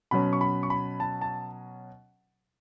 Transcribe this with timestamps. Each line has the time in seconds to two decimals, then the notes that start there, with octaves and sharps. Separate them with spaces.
0.11 B2 F#3 C#4 B5
0.33 C#6
0.41 B5
0.63 C#6
0.70 B5
1.00 A5
1.21 A5